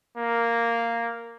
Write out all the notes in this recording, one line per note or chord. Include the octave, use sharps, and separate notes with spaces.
A#3